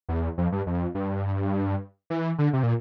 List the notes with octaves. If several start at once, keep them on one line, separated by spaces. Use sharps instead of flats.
E2
F2
G2
F2
G2
E3
D3
C3
A#2